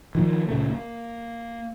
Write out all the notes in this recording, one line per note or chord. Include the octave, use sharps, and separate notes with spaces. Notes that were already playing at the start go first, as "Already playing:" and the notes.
D#3 F3 A#3
C#2 A#2 C#3 A3
A#3